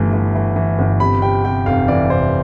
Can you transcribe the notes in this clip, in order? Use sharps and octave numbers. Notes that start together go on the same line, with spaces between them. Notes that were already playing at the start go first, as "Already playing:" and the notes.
Already playing: G1 G2 E3 A3
E3
E3
E3
G1
C3 B5
C3 G5
C3 G5
F1 F5
E3 D5
F1 C5